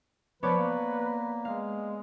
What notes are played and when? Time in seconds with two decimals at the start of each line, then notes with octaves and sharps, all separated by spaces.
0.43 F3 B3 B4 C#5 D5
0.58 A#3
1.45 G#3 F5